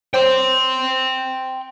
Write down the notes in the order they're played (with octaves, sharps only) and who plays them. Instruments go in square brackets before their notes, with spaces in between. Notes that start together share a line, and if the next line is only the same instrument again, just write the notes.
[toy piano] C5 C#5 D6 [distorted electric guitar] G5 C6